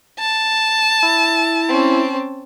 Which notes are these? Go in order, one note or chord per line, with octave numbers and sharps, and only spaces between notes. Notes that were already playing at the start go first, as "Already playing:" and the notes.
A5
E4
C4 C#4